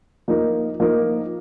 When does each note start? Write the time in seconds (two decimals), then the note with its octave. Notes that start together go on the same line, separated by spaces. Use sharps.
0.28 F3 A#3 D#4 A#4
0.80 F3 A#3 D#4 A#4